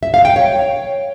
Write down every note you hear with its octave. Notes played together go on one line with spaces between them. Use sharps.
E5
F5
G5
C#5